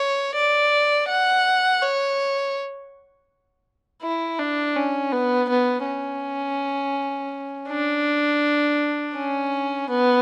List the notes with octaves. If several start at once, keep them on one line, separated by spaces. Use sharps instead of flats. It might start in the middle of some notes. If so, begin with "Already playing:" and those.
Already playing: C#5
D5
F#5
C#5
E4
D4
C#4
B3
B3
C#4
D4
C#4
B3